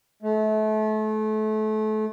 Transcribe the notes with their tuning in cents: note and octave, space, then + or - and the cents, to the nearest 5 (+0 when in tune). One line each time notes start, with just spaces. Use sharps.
A3 -30